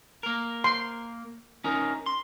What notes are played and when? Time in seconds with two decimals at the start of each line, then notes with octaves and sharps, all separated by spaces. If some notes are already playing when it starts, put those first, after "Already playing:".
0.23 A#3 A#4
0.64 C6
1.64 C#4 D#4 A#4
2.06 C6